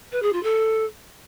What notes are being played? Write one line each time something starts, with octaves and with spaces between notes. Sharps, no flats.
B4
G#4
F4
A4